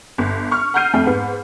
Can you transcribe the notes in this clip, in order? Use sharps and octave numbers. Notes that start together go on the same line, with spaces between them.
G1
C#6 F6
F#5 A#5 F6 G6 C7 D#7
F2 A3 G5
G#2 B3